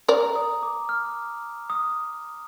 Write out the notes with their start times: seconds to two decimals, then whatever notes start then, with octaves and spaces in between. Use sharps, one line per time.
0.08 A#4 D5 A#5
0.36 D#6
0.63 D6
0.89 F6
1.70 D#6